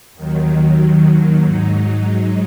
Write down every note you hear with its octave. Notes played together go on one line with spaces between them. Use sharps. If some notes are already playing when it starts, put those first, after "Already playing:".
D#2 D#3 F#3
G#2 F#3 D#4